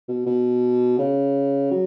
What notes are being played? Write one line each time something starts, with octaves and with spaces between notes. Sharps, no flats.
B2
B2
C#3
F#3